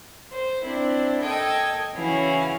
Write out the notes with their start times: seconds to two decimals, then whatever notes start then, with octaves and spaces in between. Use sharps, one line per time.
0.33 C5
0.64 C4 D4 E4
1.22 A4 D#5 G5 G#6
1.95 C#3 E3 C#4 E4 F#4 F5